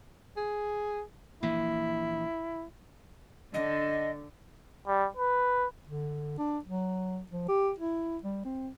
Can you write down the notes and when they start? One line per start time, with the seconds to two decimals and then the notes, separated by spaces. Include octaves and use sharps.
0.37 G#4
1.42 A#1 E3 A#3 E4
3.54 D3 D#5
4.87 G3
5.17 B4
5.87 D3
6.38 D4
6.65 F#3
7.32 F3
7.48 G4
7.79 E4
8.23 G3
8.45 C4